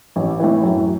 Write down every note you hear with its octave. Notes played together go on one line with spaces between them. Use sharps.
A1
A2 E3
F#2